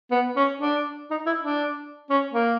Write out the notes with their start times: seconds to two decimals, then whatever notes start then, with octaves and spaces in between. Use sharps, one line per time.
0.11 B3
0.36 C#4
0.61 D4
1.10 D#4
1.26 E4
1.43 D4
2.10 C#4
2.33 A#3